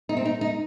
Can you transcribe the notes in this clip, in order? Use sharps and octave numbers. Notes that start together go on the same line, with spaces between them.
D#4
C4
D#4
D#4